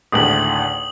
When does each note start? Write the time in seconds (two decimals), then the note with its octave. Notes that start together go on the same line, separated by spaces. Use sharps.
0.12 G#1 D2 A2 D#6 F#7